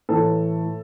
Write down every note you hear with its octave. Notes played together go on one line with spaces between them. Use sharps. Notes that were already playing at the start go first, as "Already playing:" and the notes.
A2 E3 A4